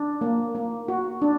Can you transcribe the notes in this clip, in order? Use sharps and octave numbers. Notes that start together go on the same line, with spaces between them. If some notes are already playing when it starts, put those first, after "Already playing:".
Already playing: D4
A#3
A#3
F#4
D4